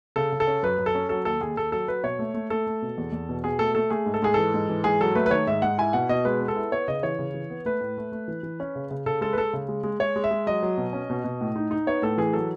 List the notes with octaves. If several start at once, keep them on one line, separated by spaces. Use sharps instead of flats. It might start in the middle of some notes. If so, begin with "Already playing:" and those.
C#3 A4
C#3
A4
C#4
F#2 B4
F#2
A4
C#4
F#3 A4
D#2 A4
D#2 G#4
D#2 A4
F#3 A4
F#3 B4
B2 C#5
A3
A3
A3 A4
A3
B2
E2
E2
B2
B2 G#4
A3 A4
A3 A4
A3 G#4
G#2
A4
G#2 G#4
E3 A4
G#2
E3
G#2 G#4
F#3 A4
A3 B4
B4
D#3 C#5
G#2 E5
G#2 F#5
E4 G#5
B2 F#5
B2 D#5
G#3 B4
B3
A4
E4
B3 C#5
C#3 D#5
E3 C#5
C#3
E3
B3
A3 B4
A2
A3
A3
E3
E3
C#4
C#3
C#3
C#3 A4
G#3 A4
B4
G#3 A4
C#3
G#3
G#3
G#3 C#5
G#3
E5
G#3
F#3 D#5
F#3
B2
C#4
B2
B2
A2
D#4
D#4
B3 C#5
A2 A4
E3 G#4
F#3 A4